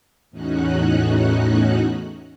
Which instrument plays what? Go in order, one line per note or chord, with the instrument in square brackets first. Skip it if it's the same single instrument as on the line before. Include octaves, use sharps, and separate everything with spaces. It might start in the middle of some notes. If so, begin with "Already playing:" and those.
[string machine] E2 A2 C#4 D#4 F#4 F#6